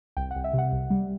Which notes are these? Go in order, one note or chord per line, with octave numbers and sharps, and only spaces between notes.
C2 G5
F#5
C2
E5
C3 F#5
C2
G3